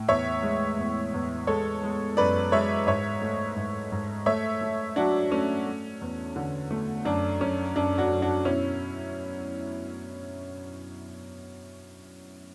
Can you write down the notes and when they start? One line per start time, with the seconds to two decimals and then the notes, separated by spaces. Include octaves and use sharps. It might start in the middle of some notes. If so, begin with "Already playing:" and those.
Already playing: A2
0.08 E2 C#5 E5
0.43 G#3
0.78 E2
1.13 E2
1.47 G#3 A4 C#5
1.83 G#3
2.17 F#2 B4 D5
2.52 G#3 C#5 E5
2.87 G#2 C#5 E5
3.21 A3
3.56 G#2
3.92 G#2
4.26 A3 C#5 E5
4.61 A3
4.96 F#3 D4 F#4
5.32 A3 C#4
5.67 A3
6.01 E2
6.36 D3
6.71 A3
7.05 F#2 D4
7.40 F#2 C#4
7.76 F#2 D4
7.98 D4 F#4
8.10 F#2
8.22 D4 F#4
8.45 B2 C#4 E4